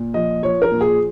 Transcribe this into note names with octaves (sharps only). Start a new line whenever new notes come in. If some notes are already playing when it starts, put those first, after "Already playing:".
Already playing: A#2
F3 D#5
F3 C#5
A#4
A#2
G#4